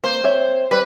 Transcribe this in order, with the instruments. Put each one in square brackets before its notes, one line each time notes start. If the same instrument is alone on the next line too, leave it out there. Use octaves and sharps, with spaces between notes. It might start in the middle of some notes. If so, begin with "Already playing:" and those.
[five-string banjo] A#3 [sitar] C5
[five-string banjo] C4 C#5 E5
[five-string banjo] G3 [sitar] B4